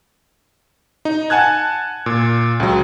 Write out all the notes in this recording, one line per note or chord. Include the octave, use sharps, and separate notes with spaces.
D#4
F#5 G#5 A5 F#6 G#6
A#2
C#2 F#3